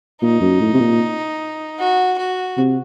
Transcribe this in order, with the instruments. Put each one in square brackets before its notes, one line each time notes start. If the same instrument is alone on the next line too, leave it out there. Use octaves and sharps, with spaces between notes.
[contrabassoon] A#2 [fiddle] D#4
[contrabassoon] F#2
A2
C3
A#2
[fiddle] F#4
F#4
[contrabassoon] C3